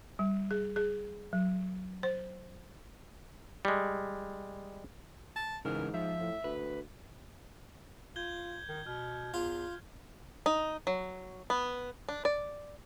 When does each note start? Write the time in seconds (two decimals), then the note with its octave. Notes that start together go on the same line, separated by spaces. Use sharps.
0.19 G3
0.51 G#4
0.76 G#4
1.33 F#3
2.03 C5
3.65 G3 G#3
5.36 A5
5.65 G#2 C#3 E3 A#4
5.94 F3 E5
6.20 A2
6.44 D2 B4
8.16 F4 G6 G#6 G7
8.68 D#3
8.86 B2 F6
9.34 E2 F4
10.46 D#4
10.87 F#3
11.50 B3
12.09 D4
12.25 D5